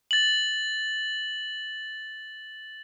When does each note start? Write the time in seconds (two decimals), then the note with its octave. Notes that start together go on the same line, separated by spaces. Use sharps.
0.11 A6 F#7